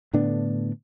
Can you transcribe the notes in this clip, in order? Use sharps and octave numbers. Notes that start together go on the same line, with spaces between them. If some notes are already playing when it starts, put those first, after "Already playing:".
A2 D3 B3 D4